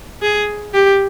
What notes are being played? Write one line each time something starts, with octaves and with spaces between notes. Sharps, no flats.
G#4
G4